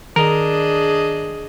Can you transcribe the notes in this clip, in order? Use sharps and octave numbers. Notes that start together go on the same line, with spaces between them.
D#3 D4 G#4 A#4 D#5